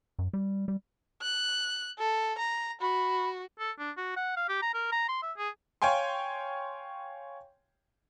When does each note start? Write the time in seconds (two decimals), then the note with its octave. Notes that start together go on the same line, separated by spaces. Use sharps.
0.19 F#2
0.33 G3
0.68 G3
1.22 F#6
1.99 A4
2.38 A#5
2.81 F#4 B5
3.59 A4
3.79 D4
3.97 F#4
4.16 F#5
4.37 F5
4.49 G4
4.62 A#5
4.74 A#4
4.92 A#5
5.08 C6
5.22 E5
5.37 G#4
5.82 C#5 F5 G5 G#5 C6